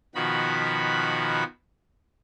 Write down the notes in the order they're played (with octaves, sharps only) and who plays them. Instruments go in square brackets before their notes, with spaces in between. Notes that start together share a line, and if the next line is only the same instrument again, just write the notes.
[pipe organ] B2 D#3 F3 F#4 B5